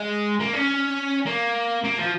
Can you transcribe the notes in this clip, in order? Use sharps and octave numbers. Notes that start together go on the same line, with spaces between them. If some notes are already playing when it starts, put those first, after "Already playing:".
Already playing: G#3
A#3
C#4
A#3
A#3
F3